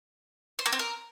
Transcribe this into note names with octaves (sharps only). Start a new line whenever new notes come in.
C5
A#3
C4
A#4